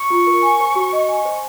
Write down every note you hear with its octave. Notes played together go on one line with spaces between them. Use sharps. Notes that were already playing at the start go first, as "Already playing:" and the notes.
Already playing: C#6
F4
A#4
G#5
C5
F#4
D#5
G#5
C5